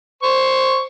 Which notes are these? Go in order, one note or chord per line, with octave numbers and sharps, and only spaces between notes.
C5 C#6